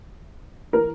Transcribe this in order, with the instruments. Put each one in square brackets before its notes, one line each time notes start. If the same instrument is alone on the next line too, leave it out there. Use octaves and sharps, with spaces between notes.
[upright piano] E3 A#4